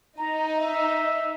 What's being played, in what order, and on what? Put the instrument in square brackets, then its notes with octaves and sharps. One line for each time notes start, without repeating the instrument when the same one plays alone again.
[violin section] D#4 [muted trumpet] A#5
[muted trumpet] E5